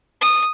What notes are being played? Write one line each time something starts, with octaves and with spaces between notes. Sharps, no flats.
D#6